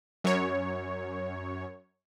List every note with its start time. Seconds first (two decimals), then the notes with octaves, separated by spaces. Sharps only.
0.24 F#2 C#5